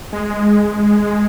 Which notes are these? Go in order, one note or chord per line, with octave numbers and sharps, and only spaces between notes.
G#3